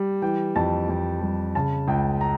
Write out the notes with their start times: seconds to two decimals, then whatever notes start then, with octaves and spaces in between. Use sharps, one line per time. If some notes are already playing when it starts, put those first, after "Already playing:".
Already playing: G3
0.22 E3 G5
0.56 F2 A5
0.89 F2
1.22 G3
1.55 C#3 A5
1.88 C#2 G5
2.21 A#5